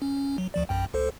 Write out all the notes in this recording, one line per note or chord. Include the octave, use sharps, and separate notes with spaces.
C#4
F#3
D2 F3 D5
A#1 F#2 G5
C#2 A4 C5